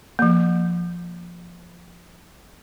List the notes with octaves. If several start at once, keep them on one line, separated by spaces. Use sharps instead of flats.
F3 A#3